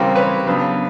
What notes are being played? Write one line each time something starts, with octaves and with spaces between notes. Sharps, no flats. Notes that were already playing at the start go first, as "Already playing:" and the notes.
Already playing: C#3 E3 G3 C4 A#4 C5
B4 C#5
C#3 F#3 B3 D4